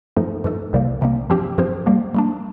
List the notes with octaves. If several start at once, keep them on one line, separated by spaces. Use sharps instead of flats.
G2 F3 A3 D#4 A4
G2 F3 A3 D#4 A4
C2 C3 G3 A#3
C2 C3 G3 A#3
G2 F3 C4 G4 C5
G2 F3 C4 G4 C5
G3 A#3 D4
G3 A#3 D4